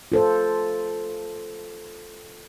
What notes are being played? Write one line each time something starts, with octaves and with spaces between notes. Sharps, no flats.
F4 A4 C5